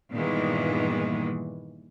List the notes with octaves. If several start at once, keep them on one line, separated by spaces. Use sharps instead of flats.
G2 A#2 D#3 E3 G#3 B3